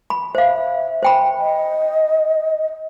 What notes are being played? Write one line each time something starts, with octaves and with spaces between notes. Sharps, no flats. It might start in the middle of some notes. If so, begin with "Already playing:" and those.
B5
C5 E5 F5
C5 G5 B5
D#5